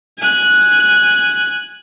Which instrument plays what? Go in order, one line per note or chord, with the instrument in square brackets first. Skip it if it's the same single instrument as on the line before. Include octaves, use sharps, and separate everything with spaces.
[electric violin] G#5 F#6